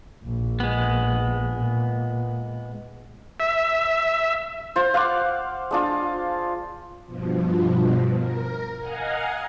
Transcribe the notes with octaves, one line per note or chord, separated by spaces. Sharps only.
A#1
G#3 B3
A#2
E5
F4 C5
F5 F#5 C6 D6
G#3 D4 F4
G2 B2 F3
A#4
D#5 F5 F#5 G#5 A#5